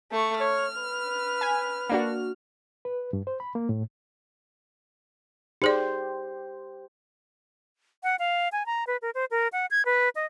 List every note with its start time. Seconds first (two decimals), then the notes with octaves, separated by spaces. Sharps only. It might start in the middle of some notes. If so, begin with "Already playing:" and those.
0.12 A3 C#6
0.40 C#5 F6
0.77 B4
1.41 G#5 G#6 B6
1.90 A#3 D4 F#4
2.85 B4
3.13 G2
3.27 C5
3.40 B5
3.55 A#3
3.69 A2
5.62 D#4 G4 G#4 C5 D5
8.03 F#5
8.19 F5
8.52 G#5
8.66 A#5
8.87 B4
9.02 A#4
9.15 C5
9.31 A#4
9.53 F#5
9.71 G#6
9.85 B4
10.15 D#5